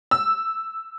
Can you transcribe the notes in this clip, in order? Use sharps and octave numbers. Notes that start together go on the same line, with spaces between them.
E6